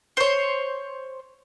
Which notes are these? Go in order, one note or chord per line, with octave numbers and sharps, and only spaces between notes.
C5 C#5